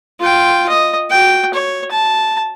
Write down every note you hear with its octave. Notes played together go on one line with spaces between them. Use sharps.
F4 G5
D#5
F#4 G5
C#5
A5